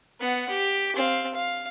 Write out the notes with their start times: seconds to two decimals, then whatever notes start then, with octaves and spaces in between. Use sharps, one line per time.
0.20 B3 F#5
0.50 G4
0.96 C4 F5
1.34 F5